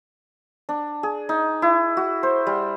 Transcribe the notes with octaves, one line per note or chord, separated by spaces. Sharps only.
D4
G#4
D#4
E4
F#4
C5
G3